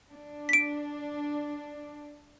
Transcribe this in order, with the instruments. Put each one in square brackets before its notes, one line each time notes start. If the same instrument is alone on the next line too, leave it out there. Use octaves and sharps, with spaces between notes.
[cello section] D4
[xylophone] B6 D7